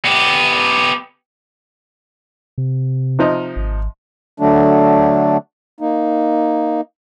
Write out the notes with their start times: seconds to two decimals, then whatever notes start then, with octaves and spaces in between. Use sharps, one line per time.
0.05 B3 G4
2.58 C3
3.19 C3 F3 D#4
3.56 G#1
4.40 D3 F#3 A3 D4
5.80 A#3 D#4